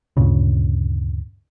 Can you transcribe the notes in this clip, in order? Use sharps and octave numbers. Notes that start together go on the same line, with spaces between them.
D2 G2 A#2 C#3